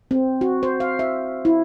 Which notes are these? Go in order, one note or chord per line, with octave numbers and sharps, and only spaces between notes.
C4
F#4
C5
F5
E5
E4